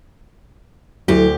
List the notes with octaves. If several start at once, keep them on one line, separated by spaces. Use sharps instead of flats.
D2 F#3 E4 G4